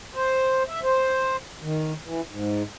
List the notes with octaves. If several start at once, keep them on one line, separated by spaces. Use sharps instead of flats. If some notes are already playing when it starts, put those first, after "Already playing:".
C5
E5
C5
D#3
E3
G#2